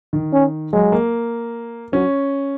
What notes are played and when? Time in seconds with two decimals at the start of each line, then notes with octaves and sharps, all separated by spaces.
0.13 D#3
0.33 C#4
0.73 F#3 G#3
0.92 A#3
1.93 F#3 C#4